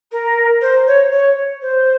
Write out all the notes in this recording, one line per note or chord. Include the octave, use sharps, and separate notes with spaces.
A#4
C5
C#5
C#5
C5